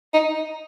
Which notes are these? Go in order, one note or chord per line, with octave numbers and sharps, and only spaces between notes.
D#4